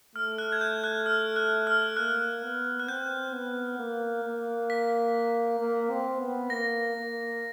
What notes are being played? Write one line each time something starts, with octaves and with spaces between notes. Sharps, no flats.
A3 F6
F#6
G#6
G6
F#6
F6
F#6
F6
A#3 F#6
B3
F#6
C4 G6
B3
A#3
A#3
B6
A#3
C4
B3
A#3 A#6
A#3